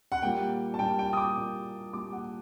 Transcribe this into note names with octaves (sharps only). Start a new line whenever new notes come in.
F#5
A#2 G3 A#3 G5
A5
A#2 G3 A#3 G5
G5
D#6
D6
A#2 G3 A#3
A#2 G3 A#3 D6
F#5